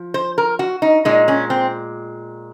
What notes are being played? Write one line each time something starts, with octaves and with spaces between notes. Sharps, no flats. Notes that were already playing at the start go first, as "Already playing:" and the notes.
Already playing: F3
C5
A#4
F#4
D#4
A#2 G#3 D#4
C#4
C4